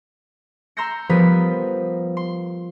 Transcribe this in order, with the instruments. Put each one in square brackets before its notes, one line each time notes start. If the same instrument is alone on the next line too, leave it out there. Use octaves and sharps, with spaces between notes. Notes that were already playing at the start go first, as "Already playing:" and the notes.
[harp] A#5 C6 E6 G6 A#6 C#7
F3 G3 B3 A#4 D#6 B6
C6